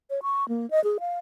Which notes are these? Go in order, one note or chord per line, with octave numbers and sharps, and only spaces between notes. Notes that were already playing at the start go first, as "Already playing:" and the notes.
C#5
C#6
A#3
D#5
G#4
F5